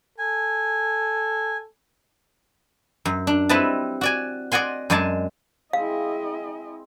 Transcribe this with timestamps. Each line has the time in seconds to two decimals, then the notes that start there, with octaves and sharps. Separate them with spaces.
0.18 A4 G#5
3.05 F#2
3.27 D4
3.49 G3 C4 E4 B4 D#5 A5
4.01 F#4 D5 G#5
4.52 D5 D#5 F#5 G#5 C6
4.90 F#2 G#3 D5 G#5 A5
5.73 G#3 C4 E4 G#4 D#5 F5